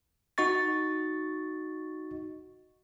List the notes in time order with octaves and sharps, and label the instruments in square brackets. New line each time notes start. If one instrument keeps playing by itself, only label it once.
[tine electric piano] D#4 F#4 D#5 C#6 A6